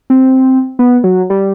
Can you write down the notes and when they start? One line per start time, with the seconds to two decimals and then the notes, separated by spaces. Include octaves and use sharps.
0.10 C4
0.79 B3
1.04 F#3
1.30 G3